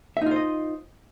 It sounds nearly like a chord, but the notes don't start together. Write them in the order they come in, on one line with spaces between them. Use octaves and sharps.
E5 D#4 F4 C5 D#5